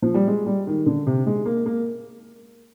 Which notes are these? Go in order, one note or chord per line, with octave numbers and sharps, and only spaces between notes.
F3
G3
G#3
G3
D#3
D3
C3
G#3
A#3
A#3